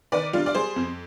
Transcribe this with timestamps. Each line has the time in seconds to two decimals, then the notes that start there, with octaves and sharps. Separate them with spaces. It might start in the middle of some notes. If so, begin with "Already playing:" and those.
0.12 D#3 B4 D5
0.33 G3 D4 F4
0.46 D5
0.54 G3 G#4 C5
0.76 F2